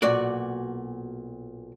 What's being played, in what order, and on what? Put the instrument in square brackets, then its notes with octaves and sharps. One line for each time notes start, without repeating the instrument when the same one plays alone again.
[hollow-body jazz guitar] B1 A#2 F#4 D5